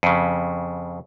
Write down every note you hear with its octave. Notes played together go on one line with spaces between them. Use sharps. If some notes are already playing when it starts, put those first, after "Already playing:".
F2 C#3